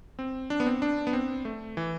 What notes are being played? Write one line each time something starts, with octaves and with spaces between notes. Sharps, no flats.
C4
D4
B3
C4
D4
B3
C4
A3
E3